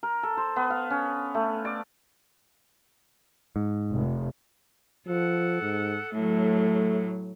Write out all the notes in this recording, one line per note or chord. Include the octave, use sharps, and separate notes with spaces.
A#4
A4
C5
B3
F5
C#4
A3
D5
G#2
F1
F3 A4 F#5
G#2
A2 F#3 A3